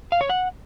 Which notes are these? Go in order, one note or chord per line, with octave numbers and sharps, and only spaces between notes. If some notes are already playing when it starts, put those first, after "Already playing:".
F5
C#5
F#5